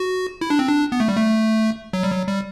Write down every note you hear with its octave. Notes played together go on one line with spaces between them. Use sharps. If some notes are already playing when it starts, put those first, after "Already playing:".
Already playing: F#4
E4
D4
C4
D4
B3
A3
G3
A3
F#3
G3
F#3
G3